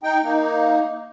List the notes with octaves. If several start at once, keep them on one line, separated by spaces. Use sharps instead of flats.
D#4 G5
A#3 D#4